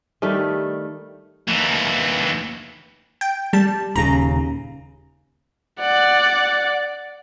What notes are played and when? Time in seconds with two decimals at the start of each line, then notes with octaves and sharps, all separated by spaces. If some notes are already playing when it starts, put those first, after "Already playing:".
0.22 D#3 G3 A3
1.48 D#2 E3
3.21 G5
3.53 G3 A5
3.96 D#1 D#2 C#3 A#5
5.80 D5 F#5